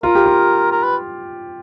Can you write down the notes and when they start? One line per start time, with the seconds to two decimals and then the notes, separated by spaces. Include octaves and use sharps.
0.03 F4 A#4
0.15 G4
0.26 F4
0.72 A#4
0.84 B4